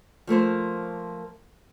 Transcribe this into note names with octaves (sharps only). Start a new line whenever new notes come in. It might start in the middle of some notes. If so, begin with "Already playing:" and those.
F3 A3 A#3 C5